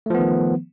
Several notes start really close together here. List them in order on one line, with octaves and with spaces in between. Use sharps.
A3 F3 B3 D#3